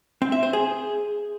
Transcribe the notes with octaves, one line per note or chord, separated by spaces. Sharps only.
C4
E5
C5
G#4